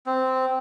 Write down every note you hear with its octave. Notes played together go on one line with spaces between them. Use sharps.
C4